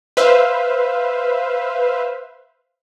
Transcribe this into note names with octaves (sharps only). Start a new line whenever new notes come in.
B4 C5 E5 F5